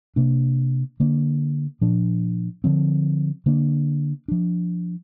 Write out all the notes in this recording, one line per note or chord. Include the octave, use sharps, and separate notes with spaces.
C3 A#3 D4
D3 A#3 D4
A#2 F3 D4
D3 F3 C4
D3 A#3 D4
F3 D4